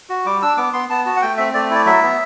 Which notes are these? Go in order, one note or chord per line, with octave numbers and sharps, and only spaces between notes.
F#4
G3 D6
D4 E6
B3 D6
B3 C6
B3 A5
F#4 A5
F#5
A3 G5
C4 E5
A3 D5
E4 D5
F#3 E5
B3